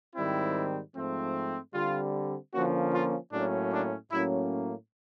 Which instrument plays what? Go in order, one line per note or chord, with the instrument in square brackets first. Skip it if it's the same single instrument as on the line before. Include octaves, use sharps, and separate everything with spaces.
[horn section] G#2 D#3 G3 C4 E4
G#2 F3 A3 C4
D3 G3 C4 F4
D3 F3 A#3 C#4 F#4
F4
A2 F#3 A#3 C#4 D4
D4
A2 F#3 A#3 C#4 E4